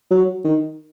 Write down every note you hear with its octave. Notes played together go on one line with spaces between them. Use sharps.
F#3
D#3